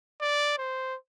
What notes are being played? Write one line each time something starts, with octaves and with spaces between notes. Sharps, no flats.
D5
C5